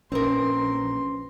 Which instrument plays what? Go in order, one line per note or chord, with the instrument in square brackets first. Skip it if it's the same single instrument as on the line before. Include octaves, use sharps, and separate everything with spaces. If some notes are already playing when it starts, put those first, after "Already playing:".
[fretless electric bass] A#1 [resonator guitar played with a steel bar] C4 A#4 [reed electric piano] C#4 B4 [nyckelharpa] C6